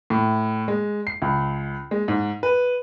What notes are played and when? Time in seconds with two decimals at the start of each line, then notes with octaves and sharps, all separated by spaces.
0.10 A2
0.68 G#3
1.07 C7
1.22 C#2
1.91 G#3
2.08 G#2
2.43 B4